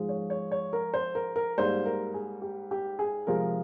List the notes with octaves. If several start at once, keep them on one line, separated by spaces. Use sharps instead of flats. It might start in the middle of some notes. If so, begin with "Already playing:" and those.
Already playing: G#2 F3 G#3
C#5
C#5
C#5
A#4
C5
A#4
A#4
G#2 G3 A#3 C5
A#4
G#4
G4
G4
G#4
C3 F3 G#3 A#4